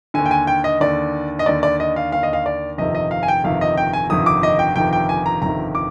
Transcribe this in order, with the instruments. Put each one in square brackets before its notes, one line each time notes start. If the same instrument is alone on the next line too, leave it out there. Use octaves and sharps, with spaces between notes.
[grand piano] D#2 D3 G#5
G5
G#5
G5
D#5
D#2 D3 D5
D#5
D#2 D3 D5
D5
D#5
F5
D#2 D3 F5
D#5
F5
D5
G1 F2 C3 D#3 D#5
D#5
F5
G#5
G5
G1 F2 C3 D#3 F5
D#5
G5
G#5
G1 F2 C3 D#3 D#6
D6
D#5
G5
G1 F2 C3 D#3 G5
G5
G#5
A#5
G1 F2 C3 D#3 A#5
D6